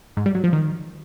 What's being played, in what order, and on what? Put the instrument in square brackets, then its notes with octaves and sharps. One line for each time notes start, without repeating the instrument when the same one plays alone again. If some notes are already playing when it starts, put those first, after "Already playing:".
[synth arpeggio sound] G#2
G3
F#3
F3
D#3